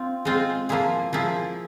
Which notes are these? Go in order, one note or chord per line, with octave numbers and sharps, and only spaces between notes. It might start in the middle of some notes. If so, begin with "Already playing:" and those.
Already playing: C4 F4
G#3 C4 F4
F3 A#3 E4 G#4
F3 A#3 E4 G#4